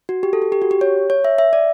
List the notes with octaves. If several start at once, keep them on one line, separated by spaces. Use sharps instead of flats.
F#4
G4
A4
G4
G4
F#4
G4
C#5
C#5
E5
E5
D5